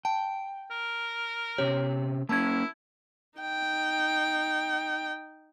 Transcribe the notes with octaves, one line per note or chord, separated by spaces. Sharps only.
G5 A5
A#4
C3 C#4 G4 C#5
A#3 C#4 E4 A5 G#6
D#4 G5